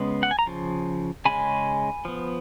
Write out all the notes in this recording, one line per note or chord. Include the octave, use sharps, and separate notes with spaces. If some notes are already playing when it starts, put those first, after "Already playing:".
Already playing: C#3 G#3 B3
F#5
G#5
A#5
C#3 F3
C#3 G#3 C#4 G#5 B5
F3 B3